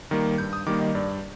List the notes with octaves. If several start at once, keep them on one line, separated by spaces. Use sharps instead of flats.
D#3 G3 A#3
G2 G6
D#6
D#3 G3 A#3 D6
D#5
G2 D5